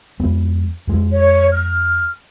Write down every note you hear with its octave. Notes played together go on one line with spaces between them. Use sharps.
F2 G#3 B3
F2 G#3
C#5
F6